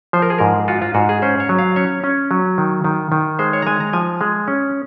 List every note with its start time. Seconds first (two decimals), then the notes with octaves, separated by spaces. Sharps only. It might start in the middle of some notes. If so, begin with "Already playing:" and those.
0.13 F3 C5
0.22 A#4
0.30 G#4
0.39 G#2 A#4
0.68 F4 F#4
0.82 F4
0.94 G#2 F#4
1.09 G#4
1.22 C#4 C5
1.40 C#5
1.49 F#3
1.59 F5
1.76 C#4 C#5
2.04 C#4
2.31 F#3
2.58 D#3
2.84 D#3
3.12 D#3
3.39 G#3 C5
3.53 C#5
3.62 A#5
3.67 G#3 G#5
3.80 A#5
3.93 F3 G#5
4.21 G#3
4.48 C#4